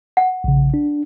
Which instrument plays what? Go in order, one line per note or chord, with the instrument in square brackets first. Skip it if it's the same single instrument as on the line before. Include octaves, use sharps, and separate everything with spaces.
[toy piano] F#5
[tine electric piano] A#1 C#3
D4